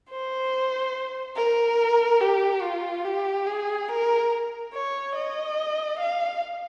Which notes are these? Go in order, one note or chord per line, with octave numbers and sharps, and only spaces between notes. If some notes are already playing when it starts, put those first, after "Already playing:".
C5
A#4
G4
F4
G4
G#4
A#4
C#5
D#5
F5